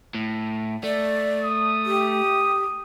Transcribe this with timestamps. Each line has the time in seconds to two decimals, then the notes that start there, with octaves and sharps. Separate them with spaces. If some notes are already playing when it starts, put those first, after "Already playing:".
0.15 A2
0.84 A3 D5
1.43 D#6
1.85 G4